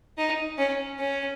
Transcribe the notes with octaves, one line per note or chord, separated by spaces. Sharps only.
D#4
C#4
C#4